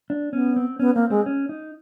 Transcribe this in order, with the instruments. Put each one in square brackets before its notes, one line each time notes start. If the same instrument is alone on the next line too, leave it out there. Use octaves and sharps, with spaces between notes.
[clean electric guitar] D4
[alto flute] B3 [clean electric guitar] C#4
[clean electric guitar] C4
[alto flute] B3 [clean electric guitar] C#4
[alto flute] A#3 [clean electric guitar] C4
[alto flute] G#3 [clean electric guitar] C4
[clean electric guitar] C#4
D#4